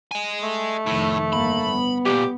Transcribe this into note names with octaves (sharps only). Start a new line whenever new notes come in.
D#5 G#5
A3
F1 A2 D#3
G1 A#3 B5
B3
C2 A#2 G4